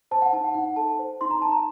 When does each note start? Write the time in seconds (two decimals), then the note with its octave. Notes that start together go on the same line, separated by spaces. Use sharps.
0.11 C5 A5
0.22 F#5
0.33 D#4 A5
0.44 F#5
0.54 D#4 F#5
0.66 F#5
0.76 A4 A5
0.99 C5
1.21 D#4 C6
1.31 A#5
1.42 D#4 A5
1.52 A#5